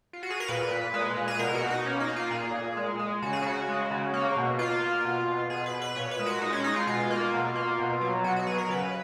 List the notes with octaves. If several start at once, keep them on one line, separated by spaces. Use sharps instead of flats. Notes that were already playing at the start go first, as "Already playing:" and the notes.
F4
F#4
G#4
A#4
A#2 B4
A#2
G#3
A#2
G#4
B2 A#4
F#4
B2
D#4
A#3 C#4
D#4
A#3
F4
A#2 G#4
A#2
G#3
G#3
C#3 F#4
G#4
C#3 F#4
G#3
C#3
A#3
B2
A#3 F4
A#3
B2
B2
B2 G#4
B4
B2
B4
A#2 C#5
B4
G#3
F#4
G#3 D#4
C#4
G#3 D#4
F4
B2 F4
A#3
B2
A#3
B2
F#3
B2 F#4
F#4
F#3 G#4
A#4
C#3 B4